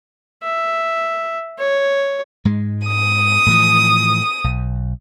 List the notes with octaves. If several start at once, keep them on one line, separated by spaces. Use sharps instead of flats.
E5
C#5
G#2 G#3
D#6
A2 E3 F3
B1